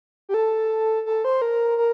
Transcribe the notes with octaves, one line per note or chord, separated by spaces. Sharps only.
G4
A4
A4
C5
A#4
A#4